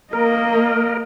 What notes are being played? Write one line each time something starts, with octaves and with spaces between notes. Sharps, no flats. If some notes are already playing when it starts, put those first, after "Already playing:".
A#3 A#4 D#5